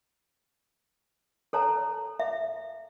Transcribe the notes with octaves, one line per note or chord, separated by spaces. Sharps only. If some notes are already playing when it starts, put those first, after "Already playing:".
A4 C#5 A5 A#5
E5